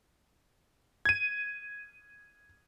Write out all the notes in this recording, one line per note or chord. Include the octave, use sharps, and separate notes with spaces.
G#6 D#7